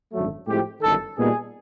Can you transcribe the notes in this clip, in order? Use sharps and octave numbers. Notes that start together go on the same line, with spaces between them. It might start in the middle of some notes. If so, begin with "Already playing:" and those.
G#1 F#2 D3 F#3 A3
A2 F3 G#3 C4 E4 G4
G1 F#2 D#3 A4
A#2 G3 B3 D#4 G#4